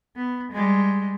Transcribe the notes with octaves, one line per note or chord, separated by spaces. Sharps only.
B3
G3 G#3